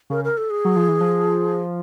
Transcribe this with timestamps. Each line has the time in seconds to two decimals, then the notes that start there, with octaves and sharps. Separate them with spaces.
0.10 C#3 A#4
0.24 A#4
0.37 A4
0.50 G#4
0.65 F#3
0.76 F3
0.88 E3
1.01 F3